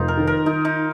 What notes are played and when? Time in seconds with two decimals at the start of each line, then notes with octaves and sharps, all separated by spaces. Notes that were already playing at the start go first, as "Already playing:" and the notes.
Already playing: F1 D#4 F4
0.08 A#4
0.17 D#3
0.27 A#4
0.46 D#3 D#4
0.65 D#4